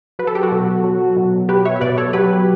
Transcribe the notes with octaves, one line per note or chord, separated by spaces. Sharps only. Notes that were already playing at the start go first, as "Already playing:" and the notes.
F#3 B4
A4
G4
F#4 A4
B2
F#3
B2
F#3 G4 B4
C#5 E5
E5
B2 B4 D5
A4 C#5
F#3 G4 B4